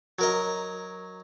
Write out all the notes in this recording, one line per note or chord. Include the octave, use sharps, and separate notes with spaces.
F#3 A#4 D#5